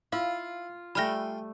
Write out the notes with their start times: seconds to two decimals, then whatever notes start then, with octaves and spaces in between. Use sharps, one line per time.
0.12 E4 F4 F5
0.95 G3 A3 G5 G#5 B5 F6 A#6